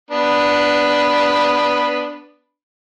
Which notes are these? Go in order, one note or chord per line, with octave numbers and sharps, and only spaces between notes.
B3 D4 B5